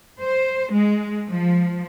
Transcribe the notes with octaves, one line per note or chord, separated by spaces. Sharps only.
C5
G#3
F3